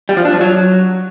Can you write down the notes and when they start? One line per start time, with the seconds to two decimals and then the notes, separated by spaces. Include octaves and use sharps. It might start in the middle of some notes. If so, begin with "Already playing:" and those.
0.09 G3
0.17 F3
0.25 D4
0.33 F3
0.41 F#3